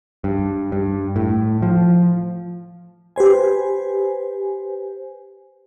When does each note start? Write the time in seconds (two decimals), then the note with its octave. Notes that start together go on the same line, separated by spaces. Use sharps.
0.24 G2
0.72 G2
1.16 A2
1.62 F3
3.16 G4 B4 C5 G#5